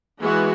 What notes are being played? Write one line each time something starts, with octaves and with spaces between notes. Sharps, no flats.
E3 G#3 B3 F#4